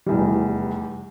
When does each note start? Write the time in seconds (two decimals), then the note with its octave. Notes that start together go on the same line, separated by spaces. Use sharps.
0.06 F1 E2 G3